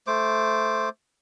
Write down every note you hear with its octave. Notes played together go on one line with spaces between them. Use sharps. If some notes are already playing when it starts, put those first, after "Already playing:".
A3 C5 D6